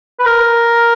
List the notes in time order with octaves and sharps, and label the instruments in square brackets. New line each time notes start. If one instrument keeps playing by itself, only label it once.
[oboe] B4
A#4